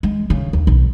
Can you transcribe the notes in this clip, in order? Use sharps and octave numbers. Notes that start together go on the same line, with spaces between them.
G#3
C#3
D#2
B1